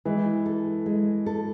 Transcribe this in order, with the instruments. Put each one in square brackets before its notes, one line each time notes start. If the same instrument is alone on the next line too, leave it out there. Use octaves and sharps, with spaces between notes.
[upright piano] E3 [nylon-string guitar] G#3
[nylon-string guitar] A4
G#3
A4